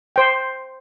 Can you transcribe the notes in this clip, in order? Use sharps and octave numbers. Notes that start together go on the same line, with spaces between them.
C5 G5